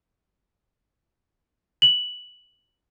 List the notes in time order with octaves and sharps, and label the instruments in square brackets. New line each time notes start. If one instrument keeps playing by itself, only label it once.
[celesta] F#7